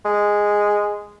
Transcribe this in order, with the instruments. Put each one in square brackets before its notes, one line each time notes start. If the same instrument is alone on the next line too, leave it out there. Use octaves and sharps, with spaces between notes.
[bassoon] G#3